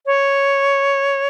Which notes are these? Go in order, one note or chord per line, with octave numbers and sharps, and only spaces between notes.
C#5